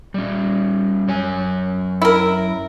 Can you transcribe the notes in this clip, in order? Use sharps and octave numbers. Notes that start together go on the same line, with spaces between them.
G3 C#4
F#2 C#5 G#5
E4 A#4